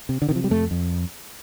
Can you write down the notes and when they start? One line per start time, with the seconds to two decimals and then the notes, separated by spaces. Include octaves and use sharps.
0.09 C3
0.22 D3
0.29 C3 D#3
0.35 F3
0.44 G3
0.50 F2 A3
0.71 F2